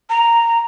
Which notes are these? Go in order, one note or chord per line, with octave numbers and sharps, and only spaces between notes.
A#5